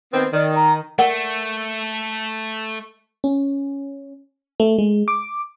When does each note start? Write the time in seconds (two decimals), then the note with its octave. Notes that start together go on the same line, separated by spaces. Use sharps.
0.13 D#3 B3 C4
0.33 D#3 D5
0.55 A#5
0.99 A3 A#4 D5 F#5
3.24 C#4
4.60 A3
4.78 G#3
5.08 D6